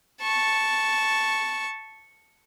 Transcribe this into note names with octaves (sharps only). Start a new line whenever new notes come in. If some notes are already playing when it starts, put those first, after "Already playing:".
A5 C#6